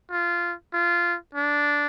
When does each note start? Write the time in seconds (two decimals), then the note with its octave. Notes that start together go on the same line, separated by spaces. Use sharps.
0.11 F4
0.73 F4
1.35 D4